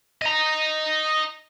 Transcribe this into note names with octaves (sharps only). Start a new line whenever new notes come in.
D#5 A#5